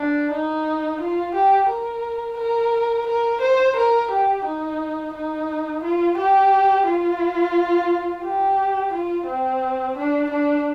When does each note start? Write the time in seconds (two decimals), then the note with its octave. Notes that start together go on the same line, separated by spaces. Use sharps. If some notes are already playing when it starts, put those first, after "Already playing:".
Already playing: D4
0.31 D#4
1.01 F4
1.35 G4
1.69 A#4
2.38 A#4
3.07 A#4
3.41 C5
3.77 A#4
4.11 G4
4.45 D#4
5.14 D#4
5.84 F4
6.17 G4
6.86 F4
8.24 G4
8.94 F4
9.27 C4
9.97 D4
10.31 D4